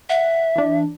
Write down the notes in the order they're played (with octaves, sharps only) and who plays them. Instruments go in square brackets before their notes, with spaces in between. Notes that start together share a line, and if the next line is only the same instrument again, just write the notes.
[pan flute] E5 [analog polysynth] F#5
[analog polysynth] E3 D4